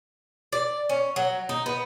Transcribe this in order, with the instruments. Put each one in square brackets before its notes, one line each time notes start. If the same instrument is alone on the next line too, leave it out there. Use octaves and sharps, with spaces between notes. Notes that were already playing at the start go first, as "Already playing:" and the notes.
[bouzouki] D5
C#4
F#3
D#4
B3